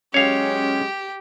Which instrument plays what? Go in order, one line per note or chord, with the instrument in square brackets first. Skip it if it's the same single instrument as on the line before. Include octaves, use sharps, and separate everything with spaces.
[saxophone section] F#3 G#3 C#4 [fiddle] G4 [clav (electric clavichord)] C#5 F5